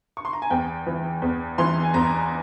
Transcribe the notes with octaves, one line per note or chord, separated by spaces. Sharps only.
C#6
C6
A#5
G#5
E2 G5
E3
E2
E3 C6
G#5
E2 A#5